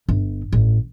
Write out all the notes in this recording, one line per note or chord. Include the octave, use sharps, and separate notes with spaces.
G1
A1